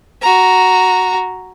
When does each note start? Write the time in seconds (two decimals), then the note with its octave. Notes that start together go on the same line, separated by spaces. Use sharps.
0.21 F#4 A#5